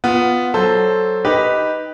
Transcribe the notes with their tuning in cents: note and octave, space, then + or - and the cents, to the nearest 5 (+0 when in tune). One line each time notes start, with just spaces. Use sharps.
B3 +5 F4 +0
F#3 +15 A4 +0 C5 +5
D#4 +5 G4 +0 B4 +0